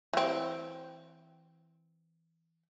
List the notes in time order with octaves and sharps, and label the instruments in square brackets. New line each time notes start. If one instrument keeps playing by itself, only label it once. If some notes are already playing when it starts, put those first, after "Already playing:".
[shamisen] E3 C4